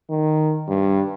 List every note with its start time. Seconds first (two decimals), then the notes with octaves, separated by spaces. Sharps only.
0.10 D#3
0.68 G2